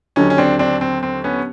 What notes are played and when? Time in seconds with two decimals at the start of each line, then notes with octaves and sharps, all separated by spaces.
0.16 D#2 D3 F#3 C#4 D#4
0.30 C#4
0.38 C4 D4
0.59 C4 D4
0.81 C4
1.03 C4
1.24 B3 C#4